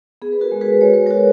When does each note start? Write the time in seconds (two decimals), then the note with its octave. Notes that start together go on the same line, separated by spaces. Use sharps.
0.22 B3 G#4
0.32 B4
0.41 F#4 A#4
0.52 G#3
0.61 G#4 B4
0.81 G#3 C#5
0.93 B4
1.06 F#4 A#4 C#5